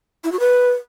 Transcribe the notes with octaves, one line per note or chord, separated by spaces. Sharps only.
E4
F#4
B4